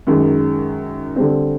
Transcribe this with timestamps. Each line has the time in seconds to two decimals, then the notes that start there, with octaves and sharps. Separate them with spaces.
0.07 F#2 D#3 G#3
1.16 D3 G3 C4